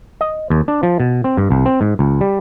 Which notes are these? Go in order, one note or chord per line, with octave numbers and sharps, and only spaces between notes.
D#5
D#2
D4
F3
B2
C4
G2
C2
C4
G#2
C#2
G3